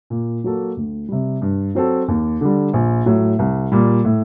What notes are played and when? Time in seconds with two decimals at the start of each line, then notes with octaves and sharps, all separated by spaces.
0.10 A#2
0.44 F#3 A#3 F#4 A4
0.77 D2
1.09 C3 G3
1.42 G2
1.75 F#3 C4 F#4 A4
2.08 D#2
2.41 D3 G3
2.73 A#1
3.06 A2 F#3
3.39 C2
3.72 A#2 G3
4.05 A2